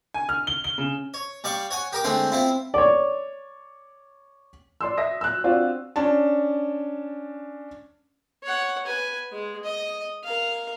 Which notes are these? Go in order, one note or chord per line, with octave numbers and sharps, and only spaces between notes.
G#5
F6
G7
G7
C#3
C#5
G3 D5 F5 C#6
C#5 F#5 G#5
G4 A#4 D6
D3 G#3 A3 C4 G5 C6
C4 E4 F4
C#5 D5
D5 C6 E6
E5 D#6 A#6
E6 F#6
C4 D4 F4 F#4 D5
C#4 D4 A5
C#5 F#5
B4 G#5
G#3
D#5
A#4 F5